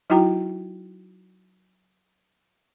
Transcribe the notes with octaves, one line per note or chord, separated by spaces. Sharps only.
F#3 D#4 E4 F#4 G5 A#5